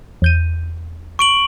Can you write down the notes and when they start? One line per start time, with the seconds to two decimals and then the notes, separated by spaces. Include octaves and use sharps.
0.22 E2 G6 D#7
1.19 C#6 D7 F#7